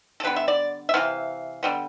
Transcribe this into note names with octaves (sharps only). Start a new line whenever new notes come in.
A4
D3 G3 B3 B4
E5
D5
E5
C3 E3 B3 F5
D3 G3 B3